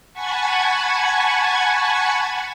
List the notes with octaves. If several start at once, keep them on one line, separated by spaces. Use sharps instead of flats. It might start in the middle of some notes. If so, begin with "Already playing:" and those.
F#5 G#5 A5 B5 C#6 G#6